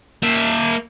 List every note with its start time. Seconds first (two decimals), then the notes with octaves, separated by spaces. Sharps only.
0.23 A#3 E5